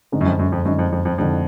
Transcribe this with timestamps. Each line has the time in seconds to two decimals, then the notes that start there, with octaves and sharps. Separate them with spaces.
0.12 G#2 D3 G#3 D#4
0.21 F#2
0.26 F2
0.39 F#2
0.52 F2
0.65 F#2 D3 G#3 D#4
0.79 F2
0.92 F2
1.05 F2
1.18 F2 D3 G#3 D#4